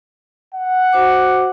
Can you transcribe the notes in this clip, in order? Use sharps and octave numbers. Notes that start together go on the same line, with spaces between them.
F#5
F#4 C5 D6